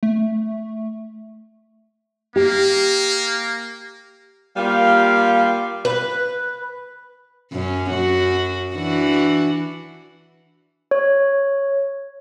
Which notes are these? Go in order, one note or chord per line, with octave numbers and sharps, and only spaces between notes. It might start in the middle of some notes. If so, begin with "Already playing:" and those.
A3
A#3 G4
G3 A#3 F4 G4 F5
B4
F#2 C#4
F#2 F#4
E3 D4 F#4
C#5